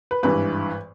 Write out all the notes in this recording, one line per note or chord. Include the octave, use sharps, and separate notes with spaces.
B4
G#1 G2 E3 B4